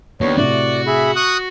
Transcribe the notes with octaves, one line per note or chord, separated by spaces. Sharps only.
D#2 B3 D4 G4 C#5
A2 C3 F#4 D5
G#4 E5 B5
C#6 D#6 F#6